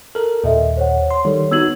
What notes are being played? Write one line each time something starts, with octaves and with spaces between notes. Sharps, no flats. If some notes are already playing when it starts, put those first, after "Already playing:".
A4 A#4 F6
D#2 A#2 A4 D#5 E5
C5 C#5 F#5
C6
D#3 G3 A4 C#5
B3 D#4 F#4 E6 G#6 F#7